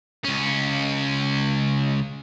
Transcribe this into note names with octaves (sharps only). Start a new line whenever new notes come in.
C#2 C#4